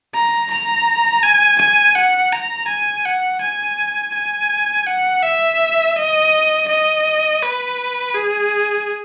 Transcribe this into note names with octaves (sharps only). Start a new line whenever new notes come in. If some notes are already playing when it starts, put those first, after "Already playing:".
A#5
A#5
G#5
G#5
F#5
A#5
G#5
F#5
G#5
G#5
F#5
E5
D#5
D#5
B4
G#4